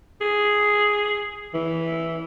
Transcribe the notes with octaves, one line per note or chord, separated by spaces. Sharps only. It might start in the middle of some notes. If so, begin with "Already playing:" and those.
G#4
E3